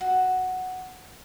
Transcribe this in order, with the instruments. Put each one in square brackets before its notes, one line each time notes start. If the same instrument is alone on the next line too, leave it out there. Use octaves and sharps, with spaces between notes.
[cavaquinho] F#4